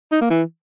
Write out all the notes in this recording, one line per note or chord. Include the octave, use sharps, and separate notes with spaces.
D#4
A#3
E3